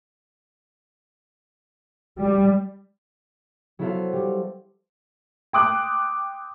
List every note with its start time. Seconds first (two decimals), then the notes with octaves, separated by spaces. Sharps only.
2.19 G3
3.79 F#3 B3 E4 A4 C5 F5
4.13 G3
5.53 G5 C6 D6 D#6 F#6